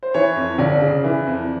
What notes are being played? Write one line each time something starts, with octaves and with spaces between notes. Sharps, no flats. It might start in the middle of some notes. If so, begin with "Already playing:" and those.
C5
E3 C#5
F2
G1 D5
C#3
E3
F2